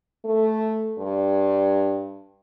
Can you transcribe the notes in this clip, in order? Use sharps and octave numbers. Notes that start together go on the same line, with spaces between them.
A3
G2